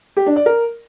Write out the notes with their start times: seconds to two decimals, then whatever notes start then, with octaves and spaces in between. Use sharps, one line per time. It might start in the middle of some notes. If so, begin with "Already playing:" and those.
0.17 G4
0.26 D4
0.36 D5
0.46 A#4